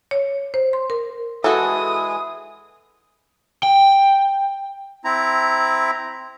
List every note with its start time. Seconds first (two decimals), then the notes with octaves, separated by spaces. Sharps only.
0.11 C#5
0.54 C5
0.73 C6
0.90 A#4
1.44 E3 G#3 E4 F#4 G#4 A4 D#6
3.63 G5
5.04 C4 E4 A#5